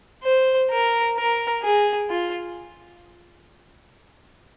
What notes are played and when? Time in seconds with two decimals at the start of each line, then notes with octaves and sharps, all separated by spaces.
0.24 C5
0.71 A#4
1.17 A#4
1.62 G#4
2.10 F4